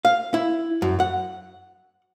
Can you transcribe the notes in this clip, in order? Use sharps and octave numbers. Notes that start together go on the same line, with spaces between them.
F5
E4
F#2
F#5